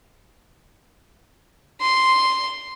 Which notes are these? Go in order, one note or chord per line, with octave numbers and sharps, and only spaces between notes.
C6